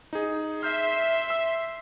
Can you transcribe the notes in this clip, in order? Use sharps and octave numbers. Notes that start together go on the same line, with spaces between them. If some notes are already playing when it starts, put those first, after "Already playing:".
D#4 G#4
E5 C6 F6 G6
E6